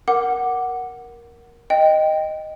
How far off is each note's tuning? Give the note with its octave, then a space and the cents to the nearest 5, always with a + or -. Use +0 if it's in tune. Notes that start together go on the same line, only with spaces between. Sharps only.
A#4 +10 F#5 +5 D6 +0
D#5 +0 G5 +0